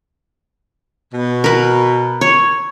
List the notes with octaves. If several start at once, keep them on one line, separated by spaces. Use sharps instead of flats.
B2
A#4 B4
C#5